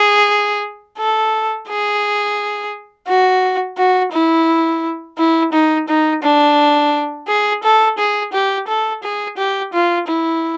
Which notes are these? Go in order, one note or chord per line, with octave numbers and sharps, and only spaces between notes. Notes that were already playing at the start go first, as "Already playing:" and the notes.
Already playing: G#4
A4
G#4
F#4
F#4
E4
E4
D#4
D#4
D4
G#4
A4
G#4
G4
A4
G#4
G4
F4
E4